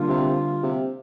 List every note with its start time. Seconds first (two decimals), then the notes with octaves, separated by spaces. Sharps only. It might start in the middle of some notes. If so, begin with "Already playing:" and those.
Already playing: D3 G3 A#3 F4
0.09 C3
0.63 C3